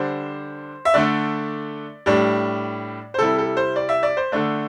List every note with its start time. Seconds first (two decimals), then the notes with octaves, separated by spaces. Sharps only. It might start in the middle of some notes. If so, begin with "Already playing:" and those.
Already playing: D3 G3 D4 C5
0.85 E5
0.94 D3 A3 D4 D5
2.06 A2 G3 D4
3.14 C5
3.19 C3 G3 E4 A4
3.38 A4
3.57 C5
3.76 D5
3.89 E5
4.03 D5
4.17 C5
4.32 D3 A3 D4